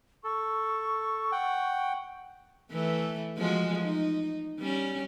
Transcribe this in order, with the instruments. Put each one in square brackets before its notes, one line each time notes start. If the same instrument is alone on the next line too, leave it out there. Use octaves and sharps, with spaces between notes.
[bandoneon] A4 [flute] C#6
[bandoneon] F#5 G5
[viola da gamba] E3 A3
F3 G#3 F#4
D#4
G3 C#4